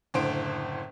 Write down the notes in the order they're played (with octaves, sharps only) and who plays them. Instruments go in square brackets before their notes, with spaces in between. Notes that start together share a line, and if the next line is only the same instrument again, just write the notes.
[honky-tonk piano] F#1 A2 D3 C5 D7